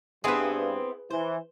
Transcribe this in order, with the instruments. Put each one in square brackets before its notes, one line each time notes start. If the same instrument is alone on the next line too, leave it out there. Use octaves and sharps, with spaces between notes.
[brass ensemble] G2 [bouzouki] B3 C4 E4 [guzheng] G#4 B4
[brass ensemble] E3 [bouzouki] C5